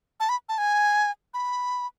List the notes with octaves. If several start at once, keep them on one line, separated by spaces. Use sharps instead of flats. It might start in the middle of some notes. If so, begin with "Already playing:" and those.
A5
B5
A5
G#5
B5